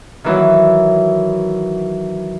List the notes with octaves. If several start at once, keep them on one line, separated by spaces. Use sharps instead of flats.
D#3 E3 F#3